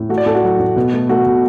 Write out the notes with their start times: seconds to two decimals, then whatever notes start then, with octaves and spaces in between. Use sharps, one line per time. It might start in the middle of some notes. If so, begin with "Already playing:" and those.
Already playing: A2
0.09 A3 F#4
0.18 D5
0.26 A2 A4
0.35 F#4
0.43 F#3
0.59 A2
0.76 B2
0.93 A3
1.09 A3 F#4
1.26 B2